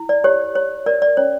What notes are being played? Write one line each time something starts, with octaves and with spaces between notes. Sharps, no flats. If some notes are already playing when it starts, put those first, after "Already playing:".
Already playing: E4
D5
G4 C#5
C#5
A#4 D5
D5
C#4 C#5